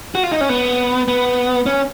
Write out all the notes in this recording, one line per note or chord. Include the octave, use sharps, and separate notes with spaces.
F#4
F4
D#4
C#4
B3
B3
C#4